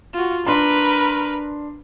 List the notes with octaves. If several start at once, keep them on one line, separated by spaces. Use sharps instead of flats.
F4 F#4
D4 A#4 B4 C6